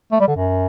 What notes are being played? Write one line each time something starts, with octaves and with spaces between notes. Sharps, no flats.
A3
G3
D3
F#2